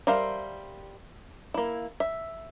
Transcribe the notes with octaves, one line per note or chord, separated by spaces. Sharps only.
G3 A#4 C5 E5 F5
A#3 E4
E5